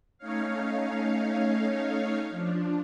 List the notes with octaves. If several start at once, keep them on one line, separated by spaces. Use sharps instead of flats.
A3 C#4 D#4 C#5 F5
F3 D4